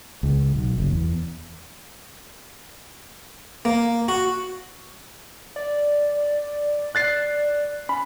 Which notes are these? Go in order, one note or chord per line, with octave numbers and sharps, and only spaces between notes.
C#2
B1
F#1
E2
A#3
F#4
D5
F#6 A6 C7
C#4 B5